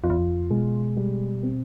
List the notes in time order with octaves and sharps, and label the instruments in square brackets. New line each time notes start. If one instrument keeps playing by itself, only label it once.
[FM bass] F2 [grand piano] F4
[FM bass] E2
F2
[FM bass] B2 [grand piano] G#3
[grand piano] G3
C4